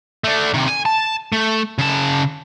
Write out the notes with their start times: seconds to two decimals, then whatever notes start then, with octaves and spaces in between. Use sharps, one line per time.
0.24 A3 D4
0.54 C3 D#3
0.68 G#5
0.85 A5
1.32 A3
1.78 C#3 A5